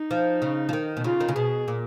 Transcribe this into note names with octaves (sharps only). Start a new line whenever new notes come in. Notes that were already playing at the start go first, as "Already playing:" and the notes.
Already playing: D#4
F3
C#3
F3
D#3
B2
C#3 F4
D#3
C#3
B2 G#4
A#2